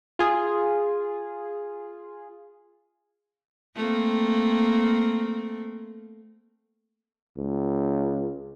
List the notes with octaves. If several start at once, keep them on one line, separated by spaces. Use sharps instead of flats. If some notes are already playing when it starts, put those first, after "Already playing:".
F4 G#4
A3 A#3 C4
C#2